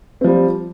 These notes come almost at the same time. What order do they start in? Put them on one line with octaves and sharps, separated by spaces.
C4 F3 G3